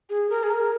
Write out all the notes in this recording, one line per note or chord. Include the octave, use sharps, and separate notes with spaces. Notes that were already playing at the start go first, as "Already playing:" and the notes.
G#4
A#4
G#4
A#4